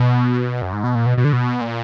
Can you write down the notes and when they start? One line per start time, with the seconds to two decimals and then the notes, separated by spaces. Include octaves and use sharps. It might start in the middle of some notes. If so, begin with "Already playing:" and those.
Already playing: B2
0.62 F#2
0.73 G#2
0.84 B2
0.95 A#2
1.06 B2
1.18 B2
1.25 D3
1.33 B2
1.61 A#2